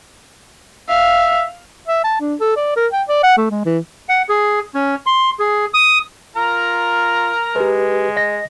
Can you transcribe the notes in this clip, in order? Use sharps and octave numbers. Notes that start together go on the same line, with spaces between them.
E5 F5
E5
A5
D4
A4
D5
A#4
G5
D5
F#5
A3
G#3
E3
F#5
G#4
C#4
C6
G#4
D#6
F4 A#4 A#5
G#3 G4 B4
D#5 A#6